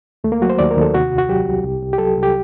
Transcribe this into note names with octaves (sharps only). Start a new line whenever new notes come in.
D#2 A3
A#3
F#3 F#4
C5
D#2 D5
A#4
D#2 A4
C3 F#4
C2
F#4
F#3 G4
C2
C2
C2
G4
F#3 A4
C2
G4